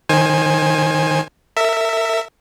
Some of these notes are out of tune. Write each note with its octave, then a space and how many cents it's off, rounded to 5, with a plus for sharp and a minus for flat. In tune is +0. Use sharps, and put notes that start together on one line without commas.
D#3 +0 C5 +30 G#5 +0
A#4 -40 E5 +0